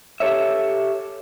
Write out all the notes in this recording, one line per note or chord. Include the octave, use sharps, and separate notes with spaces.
G4 A4 C#5 E5